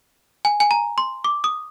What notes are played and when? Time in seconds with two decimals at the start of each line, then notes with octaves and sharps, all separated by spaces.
0.45 G#5
0.60 G#5
0.71 A#5
0.98 C6
1.24 D6
1.44 D#6